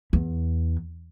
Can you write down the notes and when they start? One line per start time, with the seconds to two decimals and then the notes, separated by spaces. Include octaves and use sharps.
0.13 E2